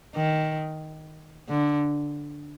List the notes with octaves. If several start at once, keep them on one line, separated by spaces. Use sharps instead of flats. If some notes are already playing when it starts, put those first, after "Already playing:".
D#3
D3